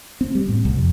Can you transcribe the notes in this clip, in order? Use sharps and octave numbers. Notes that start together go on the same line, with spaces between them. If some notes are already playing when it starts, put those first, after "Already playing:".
C4
G3
A2
C2
F2